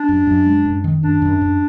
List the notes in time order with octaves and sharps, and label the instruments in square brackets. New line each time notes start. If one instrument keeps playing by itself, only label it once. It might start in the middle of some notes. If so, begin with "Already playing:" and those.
Already playing: [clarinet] D4
[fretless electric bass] F#2
F#2
G#3
F#2
D#3
[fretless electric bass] F#2 [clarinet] D4
[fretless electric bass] F#2
F#2